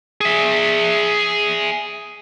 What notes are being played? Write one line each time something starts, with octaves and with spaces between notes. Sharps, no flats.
G#4 E5